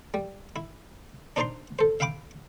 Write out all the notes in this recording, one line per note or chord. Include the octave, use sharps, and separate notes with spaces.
G3
E4
D4 D#4 C5 D5 A#5 C6
A4 C5
E5 F5 G5 B5 D6